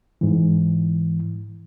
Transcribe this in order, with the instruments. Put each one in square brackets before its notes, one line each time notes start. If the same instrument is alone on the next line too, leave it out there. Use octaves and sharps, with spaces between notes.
[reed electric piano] G#2 E3